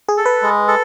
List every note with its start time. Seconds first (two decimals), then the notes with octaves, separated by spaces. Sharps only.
0.09 G#4
0.17 A4
0.26 B4
0.42 G#3
0.68 A4